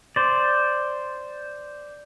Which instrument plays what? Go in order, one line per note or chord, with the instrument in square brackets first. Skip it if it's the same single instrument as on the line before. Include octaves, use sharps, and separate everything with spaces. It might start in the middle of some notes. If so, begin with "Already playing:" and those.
[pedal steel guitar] C5 D5